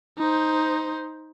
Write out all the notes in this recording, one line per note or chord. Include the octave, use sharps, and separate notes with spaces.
D#4 C5